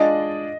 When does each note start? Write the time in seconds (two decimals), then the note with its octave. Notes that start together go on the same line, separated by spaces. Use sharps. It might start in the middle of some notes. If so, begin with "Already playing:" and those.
Already playing: G#3 D4 F4 G#4 D5 D#5